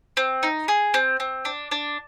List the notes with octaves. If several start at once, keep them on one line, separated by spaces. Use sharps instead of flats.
C4
D#4
G#4
C4
C4
D4
D4